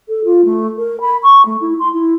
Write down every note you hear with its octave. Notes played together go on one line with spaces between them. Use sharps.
A4
F4
A3
A#4
B5
C#6
A3
E4
C6
E4